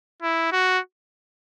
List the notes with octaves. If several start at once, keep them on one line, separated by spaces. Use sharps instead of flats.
E4
F#4